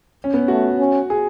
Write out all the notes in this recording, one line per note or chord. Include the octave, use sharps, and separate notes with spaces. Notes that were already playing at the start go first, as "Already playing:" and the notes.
C#4
B3
A3 F#4
C#4
G#4